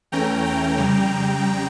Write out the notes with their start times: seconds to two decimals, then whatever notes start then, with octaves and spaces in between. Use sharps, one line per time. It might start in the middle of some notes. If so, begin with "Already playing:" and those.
0.12 E2 E3 A3 C#4 G5 A#5
0.45 G5 A#5
0.77 F2 C#3 G3